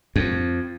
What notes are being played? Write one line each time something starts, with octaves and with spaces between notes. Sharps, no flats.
F2